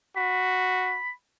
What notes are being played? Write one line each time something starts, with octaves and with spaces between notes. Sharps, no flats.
F#4 B5